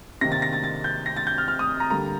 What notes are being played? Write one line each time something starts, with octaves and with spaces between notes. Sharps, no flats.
C3 D#3 A#3 A#6
A6
A#6
A6
A6
G6
A#6
A6
G6
F6
F6
D#6
A#5
D3 G3 A#3 A#5